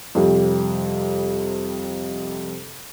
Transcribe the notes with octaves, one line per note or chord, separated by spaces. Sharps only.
F2 C3 G3